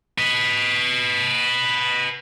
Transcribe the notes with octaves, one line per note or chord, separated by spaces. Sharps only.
B4 D#5